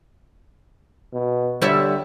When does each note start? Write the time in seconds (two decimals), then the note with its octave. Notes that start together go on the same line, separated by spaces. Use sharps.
1.13 B2
1.62 D3 G3 C#5 E5